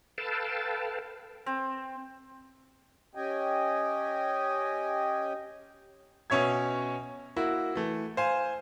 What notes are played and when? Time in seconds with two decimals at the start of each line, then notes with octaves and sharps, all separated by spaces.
0.18 A4 B4 F5 G5 A5
1.46 C4
3.15 C#4 G4 D#5 G5 G#5
6.30 B2 C#4 C#5 E5 G#6
7.36 A#3 E4 F#4
7.75 E3 A3
8.17 C5 F5 G#5